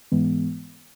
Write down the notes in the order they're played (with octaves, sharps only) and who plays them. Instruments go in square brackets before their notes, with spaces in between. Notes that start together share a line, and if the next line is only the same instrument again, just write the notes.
[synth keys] G#2 E3 G#3 B3